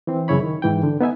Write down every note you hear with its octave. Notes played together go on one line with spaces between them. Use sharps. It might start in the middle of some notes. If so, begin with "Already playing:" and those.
E3 C4
F#2 C#3 E4 C#5 B5
D#3
G#2 E3 G5
D3
B3 D#4 E5 G#5